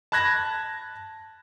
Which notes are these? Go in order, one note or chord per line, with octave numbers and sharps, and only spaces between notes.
A5 B5 F#6 G#6 A#6